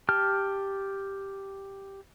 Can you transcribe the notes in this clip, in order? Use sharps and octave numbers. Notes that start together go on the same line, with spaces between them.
G4 A5 F6